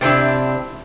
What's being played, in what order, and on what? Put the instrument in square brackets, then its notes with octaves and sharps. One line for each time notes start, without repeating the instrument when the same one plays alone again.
[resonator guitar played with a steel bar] C3 C4 D4 E4